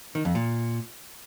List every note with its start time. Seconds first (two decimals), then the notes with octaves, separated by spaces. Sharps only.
0.15 D#3
0.25 F2
0.35 A#2